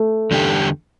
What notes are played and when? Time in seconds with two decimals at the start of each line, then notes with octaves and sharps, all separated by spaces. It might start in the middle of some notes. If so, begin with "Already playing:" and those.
Already playing: A3
0.31 E2 D3 G3 D4 G4